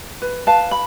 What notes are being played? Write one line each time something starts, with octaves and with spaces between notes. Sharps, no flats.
B4
B4 F5 A5
B5